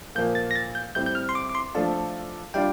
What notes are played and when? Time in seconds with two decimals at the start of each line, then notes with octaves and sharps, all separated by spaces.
0.15 A#2 F3 A#3 G6
0.35 A6
0.51 A#6
0.56 A6
0.75 G6
0.95 A2 G3 C4 G6
1.06 G6
1.15 F6
1.29 C6
1.35 D6
1.49 D6
1.55 C6
1.75 F3 A3 D4 F4 A4 A5
2.54 G3 D4 F4 G5